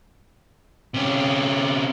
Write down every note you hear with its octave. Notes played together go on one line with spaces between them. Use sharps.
C3 C#4